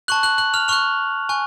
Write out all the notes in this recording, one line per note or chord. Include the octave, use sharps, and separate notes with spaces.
A5 C#6 F#6 F#7
F#6 F#7
F#6 F#7
F6 F7
C#6 F6 F#6 F7
G#5 C#6 F#6